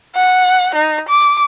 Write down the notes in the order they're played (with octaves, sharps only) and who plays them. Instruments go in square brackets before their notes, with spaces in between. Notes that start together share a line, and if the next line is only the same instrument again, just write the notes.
[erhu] F#5
D#4
D6